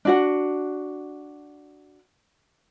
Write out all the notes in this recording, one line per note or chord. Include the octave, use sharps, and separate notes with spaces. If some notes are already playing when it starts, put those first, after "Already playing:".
D4 F#4 F#5